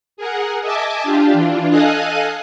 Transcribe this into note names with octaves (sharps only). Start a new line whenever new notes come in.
G#4 A#4 F#5
D#5 E5 G#5 A5 D6
D4 F4 G4
E3 D4 F4
A4 D#5 F5 G#5 D#6 F#6